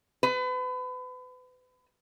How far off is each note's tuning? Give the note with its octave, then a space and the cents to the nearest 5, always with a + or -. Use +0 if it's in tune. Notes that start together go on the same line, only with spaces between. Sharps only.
B4 +35